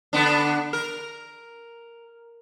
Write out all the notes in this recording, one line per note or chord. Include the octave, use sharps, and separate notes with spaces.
D3 B3 D4
A#4